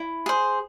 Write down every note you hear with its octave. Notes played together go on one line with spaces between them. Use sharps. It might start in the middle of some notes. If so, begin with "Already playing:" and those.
Already playing: E4
G#4 C5